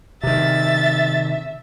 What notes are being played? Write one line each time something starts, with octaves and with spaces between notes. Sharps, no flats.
C3 D#3 E5 A6